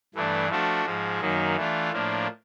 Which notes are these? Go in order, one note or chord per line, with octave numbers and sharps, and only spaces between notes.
G2 E3 A3 D4
F3 A3 D4 F#4 A4
G#2 F3 G#3
F#2 D#3 F#3 A#3 D#4
E3 A3 D4 F4
A2 F3 A#3 D4